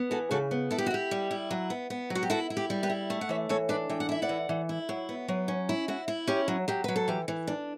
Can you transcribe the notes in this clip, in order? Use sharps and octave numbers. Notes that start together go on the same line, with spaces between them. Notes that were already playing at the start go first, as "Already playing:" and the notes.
Already playing: B3
E3 F#4 A4
C#3 F#4 A4
B3
E4 A4
G4
F#4
E4 G4
G3
E4
F#3
B3
B3
F#3
F#4
G4
E4 F#4 A4
E4
G4
G3
G4 B4
E4
A3
F#5
E3 C#5 E5
E3 A4 C#5
D4 B4 D5
E3 G5
F#5
E4 E5
D5 F#5
E3
E3
E4
F#3
B3
F#3
C#4
E4
E4 F#4
E4
C#4 G4
F#3
F#3 G4
F#3 B4
A4
E3 G4
E3
D4